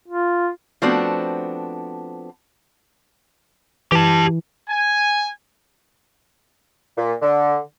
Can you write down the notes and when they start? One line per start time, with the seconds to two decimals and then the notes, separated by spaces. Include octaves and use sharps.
0.08 F4
0.82 F3 A3 B3 C4 D4 F#4
3.92 E3 G4 A5
4.68 G#5
6.97 A#2
7.22 D3